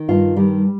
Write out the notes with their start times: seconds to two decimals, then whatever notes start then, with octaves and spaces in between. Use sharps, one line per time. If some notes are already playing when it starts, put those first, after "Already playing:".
Already playing: D#3
0.08 G2 F4
0.36 D#3 G3